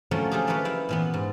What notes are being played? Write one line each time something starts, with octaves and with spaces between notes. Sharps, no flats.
D3 F3 F#3 A3 A#3 C#4
F#3 A3 F4 G4 G#4
F3 A#3 F4 G4 B4 C#5
E4 F5 G5
A#2 E3 B3
G#2